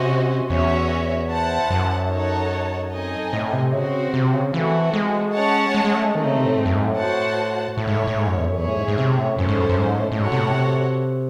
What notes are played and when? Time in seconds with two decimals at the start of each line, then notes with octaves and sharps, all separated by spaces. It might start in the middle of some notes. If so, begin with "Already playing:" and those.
Already playing: C3 C#4 F#4 C5 D#5
0.50 E2 C#4 F#4 C#5 E5
1.30 E4 C5 F#5 A5
1.70 F#2
2.11 D#4 A4 C#5 F#5 A5
2.92 C4 D#4 A4 D#5 G#5
3.33 A2
3.53 C3
3.72 C#3 C4 F#4 C5
4.14 C3
4.34 C#3
4.53 E3 A3 C4 F#4 A4
4.94 G#3
5.34 C#4 G#4 C#5 F#5 A5
5.75 G#3
5.85 G#3
5.94 A3
6.05 G#3
6.15 D#3 A3 C4 D#4
6.25 C#3
6.36 C3
6.46 A2
6.56 G#2
6.66 F#2
6.76 G#2
6.86 A2
6.96 F#4 C5 F#5 A5
7.77 A2 E4 A4 C#5
7.87 G#2
7.97 A2
8.07 A2
8.17 G#2
8.27 F#2
8.37 E2
8.47 F#2
8.57 E2 C#4 G#4 C#5 E5
8.68 A2
8.78 G#2
8.88 G#2
8.98 C3
9.18 A2
9.38 F#2 C#4 E4 A4 C5
9.49 G#2
9.58 F#2
9.69 F#2
9.79 G#2
9.99 A2
10.12 A2
10.19 G#2 F#4 A4 C#5 F#5
10.32 C3
10.39 A2
10.50 C3